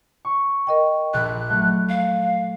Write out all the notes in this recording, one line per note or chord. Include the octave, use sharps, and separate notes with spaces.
C#6
A#4 D#5 G5
A#1 B5 F#6
F#3 A3
F5